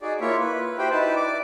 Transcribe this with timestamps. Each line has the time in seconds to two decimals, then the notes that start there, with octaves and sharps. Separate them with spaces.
0.01 D#4 F#4 G#4 D5
0.21 A#3 E4 F4 C#5 E5
0.40 B4
0.78 E4 F#4 G4 C5 G5 B5
0.91 D#4 E4 B4 A5
1.16 D5 D6